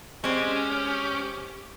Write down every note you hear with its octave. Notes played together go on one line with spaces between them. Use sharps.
G#3 C4 C#4 G4